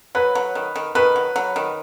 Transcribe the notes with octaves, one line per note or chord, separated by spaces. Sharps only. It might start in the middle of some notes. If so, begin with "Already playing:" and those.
F#3 B4
F#3
D#3
D#3
D#3 B4
F#3
F#3
D#3